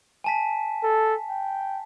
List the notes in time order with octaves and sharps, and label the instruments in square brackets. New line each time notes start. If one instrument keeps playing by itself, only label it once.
[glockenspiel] G#5 A5 B6
[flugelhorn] A4
G5